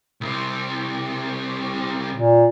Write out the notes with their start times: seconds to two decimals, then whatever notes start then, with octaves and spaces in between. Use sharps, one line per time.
0.21 C2 C3
2.14 A#2